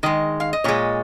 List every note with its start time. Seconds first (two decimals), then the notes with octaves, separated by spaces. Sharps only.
0.03 D#3 G#3 D#5
0.40 F5
0.53 D#5
0.64 A#2 G#3 C#5